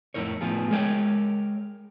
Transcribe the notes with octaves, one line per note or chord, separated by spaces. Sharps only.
F2 A2 E4 A#4 C#5
A2 F3 B3 F4 G#4
G#3 G#4 A#4 C#5 G5